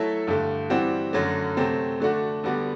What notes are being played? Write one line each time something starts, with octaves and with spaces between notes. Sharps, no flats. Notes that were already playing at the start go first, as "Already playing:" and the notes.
Already playing: F#3 A3 E4 A4 E5
G2 D3 A3
E3 G3 C4 F#4
F#2 D3 F#3 A3
C3 F#3 A3 C4
D3 A3 D4 F#4
D3 G3 B3 F#4